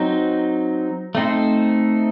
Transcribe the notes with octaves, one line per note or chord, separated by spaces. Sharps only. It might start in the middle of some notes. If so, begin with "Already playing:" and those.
Already playing: F#3 C4 D#4
A3 C4 D#4 A4 C5